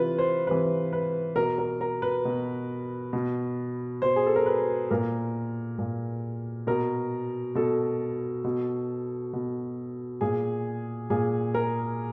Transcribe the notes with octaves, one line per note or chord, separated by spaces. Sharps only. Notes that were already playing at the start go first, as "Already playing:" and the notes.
Already playing: C3 E3 F4 B4
C5
C3 E3 B4
B4
B2 A#4
A#4
A#4
B4
B2
B2
B2 C5
G#4
A4
A#4
B4
A#2 A#4
A#2
B2 A#4
B2 A4
B2
B2
A#2 G#4
A#2 G#4
A#4